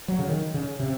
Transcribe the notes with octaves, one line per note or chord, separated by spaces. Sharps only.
F#3
C#3
D#3
C#3
C3